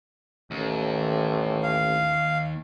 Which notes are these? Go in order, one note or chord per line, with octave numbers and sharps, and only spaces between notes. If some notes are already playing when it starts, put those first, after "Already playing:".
A1 D#2
F5